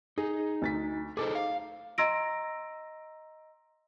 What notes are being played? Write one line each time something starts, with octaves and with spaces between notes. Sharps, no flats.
D#4 G#4
D2 A6 B6
D#4 G#4 A4 C5 D6
F5
D#5 A#5 C6 E6 A#6 D7